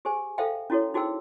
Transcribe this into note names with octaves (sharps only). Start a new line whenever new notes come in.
G4 G#4 C5 G#5
A4 C5 E5 F5 G5
C#4 E4 F#4 A4 C#5
D#4 F#4 G#4 C5 G5 E6